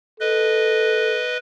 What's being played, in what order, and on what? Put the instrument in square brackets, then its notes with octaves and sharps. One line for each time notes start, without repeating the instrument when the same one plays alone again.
[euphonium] A4 [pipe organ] B4 D#5